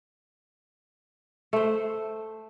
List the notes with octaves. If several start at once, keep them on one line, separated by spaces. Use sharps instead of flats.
A3 C5